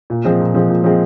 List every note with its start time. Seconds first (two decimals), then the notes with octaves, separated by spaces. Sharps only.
0.10 A#2
0.24 F3 G#3 C4
0.40 A#2
0.54 F3 G#3 C4
0.69 A#2
0.84 F3 G#3 C4